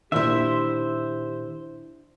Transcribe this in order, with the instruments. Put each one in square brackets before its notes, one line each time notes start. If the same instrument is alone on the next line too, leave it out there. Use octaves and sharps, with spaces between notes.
[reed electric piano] A#2 D#3 [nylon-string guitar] D4 E4 [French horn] G4 [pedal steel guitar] C5 E5